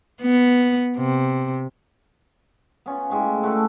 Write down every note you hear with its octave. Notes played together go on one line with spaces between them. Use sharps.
B3
C3
B3 C#4 F4
A2 G#3 G4 C#6
A3 E4 F#4 A4